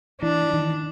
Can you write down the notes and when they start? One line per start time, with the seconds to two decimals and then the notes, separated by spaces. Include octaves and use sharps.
0.22 E3 D4
0.53 D#3